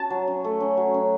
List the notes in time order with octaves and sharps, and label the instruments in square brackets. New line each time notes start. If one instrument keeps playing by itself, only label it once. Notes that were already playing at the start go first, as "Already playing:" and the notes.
Already playing: [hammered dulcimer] C#4 F#4 [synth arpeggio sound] A5
[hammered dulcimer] F#3
C#4
A3
C#4
F#3
C#4